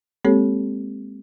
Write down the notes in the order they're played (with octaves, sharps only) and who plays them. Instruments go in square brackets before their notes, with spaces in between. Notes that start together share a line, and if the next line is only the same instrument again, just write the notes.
[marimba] G#3 A#3 C4 G4 A4 C#5